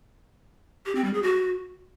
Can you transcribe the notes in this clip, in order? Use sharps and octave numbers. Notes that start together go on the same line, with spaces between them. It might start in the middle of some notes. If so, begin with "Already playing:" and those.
G4
C4
G3
G#4
F#4